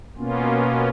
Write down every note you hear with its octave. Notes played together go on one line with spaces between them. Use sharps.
B2 A#3 B3 C#4 F4